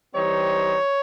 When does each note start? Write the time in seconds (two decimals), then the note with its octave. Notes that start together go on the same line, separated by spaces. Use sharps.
0.15 E3 G3 C4 D#4 C#5